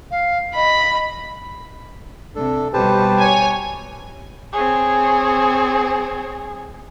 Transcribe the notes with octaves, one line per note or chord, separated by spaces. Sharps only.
F5
D#5 B5
C3 D4 A4
B2 G3 G4 B4 C5 A5
C#5 G#5
C4 G#4 C#5